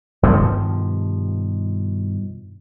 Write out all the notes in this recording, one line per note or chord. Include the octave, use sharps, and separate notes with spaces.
G2 B2 D#3 F3